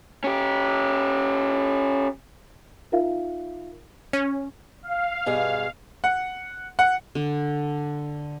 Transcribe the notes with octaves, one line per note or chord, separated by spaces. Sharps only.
C#4 G4
D#4 F4 A#4 E5 F5
C#4
F5
G2 B2 G#4
F#5
F#5
D3